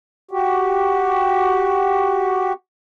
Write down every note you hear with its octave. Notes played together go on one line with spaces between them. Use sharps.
F#4 G4